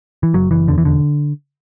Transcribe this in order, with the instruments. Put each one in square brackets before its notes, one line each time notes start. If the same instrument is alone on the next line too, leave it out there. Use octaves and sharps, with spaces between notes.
[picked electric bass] E3
F#1 F#3
F#1 E3
E2 D3
E3
E1 D3